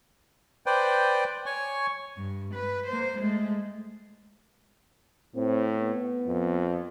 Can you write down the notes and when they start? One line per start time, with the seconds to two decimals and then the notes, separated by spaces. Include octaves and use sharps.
0.66 B4 C5 D5 G5
1.46 C#5 G#5 C#6
2.17 G2
2.54 B4
2.87 A#3 C5
3.19 G#3 A3
5.35 A2 C4
5.78 B3
6.26 F2